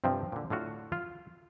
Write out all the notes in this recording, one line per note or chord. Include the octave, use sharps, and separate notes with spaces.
G2 C3 F3 C4
A#2 D3
A2 D3 F4 F#4
F4